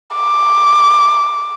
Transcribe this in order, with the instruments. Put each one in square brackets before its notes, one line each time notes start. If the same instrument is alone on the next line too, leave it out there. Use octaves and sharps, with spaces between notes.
[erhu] D6